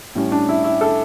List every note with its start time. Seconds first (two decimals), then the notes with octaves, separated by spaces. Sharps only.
0.15 A2 G3 C#4
0.32 D4
0.49 E4
0.64 E4
0.81 A4